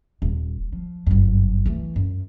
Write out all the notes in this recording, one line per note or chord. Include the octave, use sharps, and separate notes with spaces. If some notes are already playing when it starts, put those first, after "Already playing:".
D#1
F3
G1 F#2
E3 A3
F#2